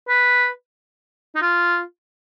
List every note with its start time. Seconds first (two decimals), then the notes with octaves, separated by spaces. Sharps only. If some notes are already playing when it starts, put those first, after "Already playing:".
0.08 B4
1.35 D#4
1.41 F4